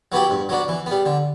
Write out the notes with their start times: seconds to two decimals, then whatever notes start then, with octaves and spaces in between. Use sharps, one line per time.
0.12 F#3 B3 E4 G4
0.30 G2
0.49 F#3 B3 D4
0.68 E3
0.86 G3 B3
1.06 D3